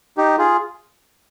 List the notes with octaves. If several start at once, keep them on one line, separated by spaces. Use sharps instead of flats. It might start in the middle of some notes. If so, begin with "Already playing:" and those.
D#4 G4
F4 G#4